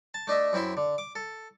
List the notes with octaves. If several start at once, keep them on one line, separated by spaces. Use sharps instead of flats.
A5
A3 D4 D#5 E5
F#2 C4 E4 E5 C6
D3
D6
A4